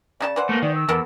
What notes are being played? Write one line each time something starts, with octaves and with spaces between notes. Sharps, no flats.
C#3 D#4 D5 A5
E3 C5 F#5
A3 A#3
D#3 D5
E6
E2 B3 A4 A#4